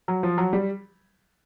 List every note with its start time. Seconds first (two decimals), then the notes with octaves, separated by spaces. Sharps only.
0.08 F#3
0.23 F3
0.38 F#3
0.53 G3